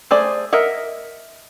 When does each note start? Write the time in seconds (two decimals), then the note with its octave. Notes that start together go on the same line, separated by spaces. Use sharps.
0.11 A3 G#4 C5 D5
0.53 A#4 D#5 E5 F#5